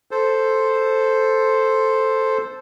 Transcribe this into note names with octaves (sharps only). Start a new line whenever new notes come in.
A4 C5